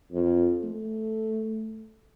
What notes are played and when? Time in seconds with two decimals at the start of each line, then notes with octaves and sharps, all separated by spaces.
0.12 F2
0.63 A3